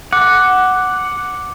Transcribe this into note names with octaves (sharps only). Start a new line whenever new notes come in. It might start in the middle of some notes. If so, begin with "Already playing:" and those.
F#5 D6